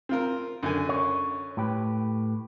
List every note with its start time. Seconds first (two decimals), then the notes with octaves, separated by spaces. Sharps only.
0.09 C4 F4 A#4
0.63 F#2 D3 G#5
0.89 C#5
1.57 A2 G4 B4